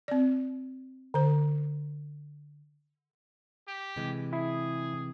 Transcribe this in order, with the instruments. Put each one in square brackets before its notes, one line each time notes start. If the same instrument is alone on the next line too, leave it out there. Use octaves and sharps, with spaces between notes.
[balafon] C4 D5
D3 C5
[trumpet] G4
[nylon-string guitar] C3 E3 G#3
[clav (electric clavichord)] E4 [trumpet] G#4